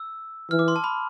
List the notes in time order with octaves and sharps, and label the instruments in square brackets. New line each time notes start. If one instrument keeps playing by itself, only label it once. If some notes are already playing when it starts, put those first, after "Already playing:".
Already playing: [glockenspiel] E6
[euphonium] E3 [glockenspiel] F6
[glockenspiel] D6
C6
A5
B5